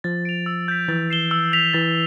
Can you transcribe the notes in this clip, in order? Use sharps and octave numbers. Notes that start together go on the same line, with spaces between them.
F3 A6
D7 F7
E6
G6 B6
E3 A6
C7 E7 G7
E6
G6 B6 F7
E3 A6